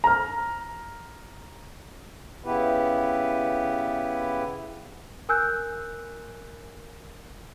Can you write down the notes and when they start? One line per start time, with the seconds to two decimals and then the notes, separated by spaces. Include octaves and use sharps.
0.04 A#5 F6
2.44 C#3 B3 E4 G4 B4
5.29 A#4 G#5 E6 F#6 G6